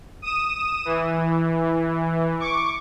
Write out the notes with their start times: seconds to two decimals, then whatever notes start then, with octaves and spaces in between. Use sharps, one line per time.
0.22 D#6 D#7 E7
0.85 E3
2.40 C#6 D6